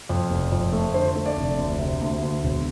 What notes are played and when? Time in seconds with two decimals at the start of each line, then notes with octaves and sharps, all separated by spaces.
0.09 F2
0.30 F1
0.52 F2
0.72 A3
0.94 D3 C5
1.15 A3
1.26 D5
1.37 F1
1.58 D2
1.79 C3
2.01 D2
2.22 D2
2.43 E1